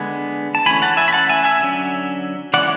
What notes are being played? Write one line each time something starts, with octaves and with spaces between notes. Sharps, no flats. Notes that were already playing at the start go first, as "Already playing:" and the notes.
Already playing: D3 G#3 B3 G#5
A5
E3 A3 C#4 G#5 B5
F#5 A5
E5 G#5
B5
F#5 A5
E5 G#5
E5 G#5
D3 F#3 C#4
E3 G#3 C#4 D5 F#5